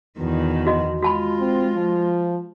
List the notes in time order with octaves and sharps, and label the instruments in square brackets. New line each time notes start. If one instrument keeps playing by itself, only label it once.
[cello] E2 D#3 [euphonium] B2
[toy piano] F#4 D#5
[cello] G#3 F4 [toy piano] F#4 A5 B5
[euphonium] C4
F3